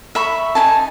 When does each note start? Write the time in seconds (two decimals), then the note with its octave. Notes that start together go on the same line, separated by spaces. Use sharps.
0.15 E5 B5 C#6
0.55 D#4 E4 G#5 A5